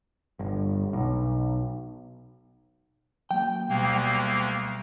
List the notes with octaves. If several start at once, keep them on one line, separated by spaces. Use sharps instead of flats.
G1
B1
F#3 A3 A#3 G5
D2 B2 G3 A#3 B3